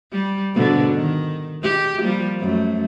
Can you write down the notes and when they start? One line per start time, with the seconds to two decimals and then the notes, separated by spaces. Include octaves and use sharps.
0.12 G3
0.54 G#2 B2 D3
0.95 D#3
1.63 G#3 G4
2.02 F3 G3 A#3
2.40 F#2 A3